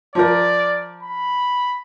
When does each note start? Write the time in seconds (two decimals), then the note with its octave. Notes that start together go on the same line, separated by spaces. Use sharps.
0.15 F3 A#4 D5
1.03 B5